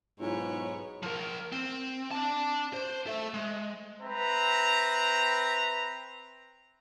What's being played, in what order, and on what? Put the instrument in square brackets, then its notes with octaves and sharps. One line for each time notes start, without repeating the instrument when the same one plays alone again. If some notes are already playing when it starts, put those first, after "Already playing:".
[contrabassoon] B1 [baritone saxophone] G#2 [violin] B3 C#5 [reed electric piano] E4 F4 G#5
[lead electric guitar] F3 A#4
C4
D4 A5
C5
A4 E5
G#3
[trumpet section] C4 B4 E5 A#5